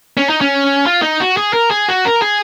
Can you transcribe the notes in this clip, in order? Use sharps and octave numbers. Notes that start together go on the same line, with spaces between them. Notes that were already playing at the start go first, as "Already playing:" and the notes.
C#4
D#4
C#4
F4
D#4
F#4
G#4
A#4
G#4
F#4
A#4
G#4